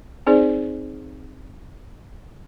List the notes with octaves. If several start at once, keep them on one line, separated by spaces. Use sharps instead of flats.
C4 D#4 G#4 C5 D5